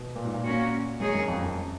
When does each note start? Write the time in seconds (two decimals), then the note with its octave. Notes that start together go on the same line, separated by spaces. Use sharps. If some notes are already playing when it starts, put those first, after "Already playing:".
Already playing: B2
0.15 A#2
0.25 G#2
0.33 A#2
0.43 A#3 C#4 F#4
1.00 F#2 D#3 G#3 D#4 G#4 C#5
1.14 F#2
1.28 F2
1.42 F#2